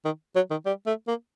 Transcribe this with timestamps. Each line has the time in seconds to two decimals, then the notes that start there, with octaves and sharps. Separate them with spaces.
0.05 D#3
0.36 F#3
0.51 D#3
0.66 G3
0.87 A3
1.08 A#3